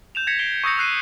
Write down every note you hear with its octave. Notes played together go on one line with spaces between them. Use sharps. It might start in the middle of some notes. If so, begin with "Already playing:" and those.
G6 E7 F7
G#6 A#6 B6 C#7
C7 D7 G7
C#6 D#6 E6 G6 A#6 C#7
E6 F#6 C7 D#7